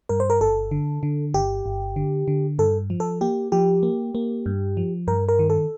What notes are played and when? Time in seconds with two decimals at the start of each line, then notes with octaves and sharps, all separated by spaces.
0.09 G2 A#4
0.20 C5
0.30 A#4
0.41 G1 A4
0.71 D3
1.03 D3
1.34 G1 G4
1.66 G1
1.96 D3
2.28 D3
2.59 G2 A4
2.90 F3
3.00 A4
3.21 A#3 G4
3.52 F3 G4
3.83 A#3
4.15 A#3
4.46 G2
4.77 F3
5.07 G2 A#4
5.29 A#4
5.39 D#3
5.50 A4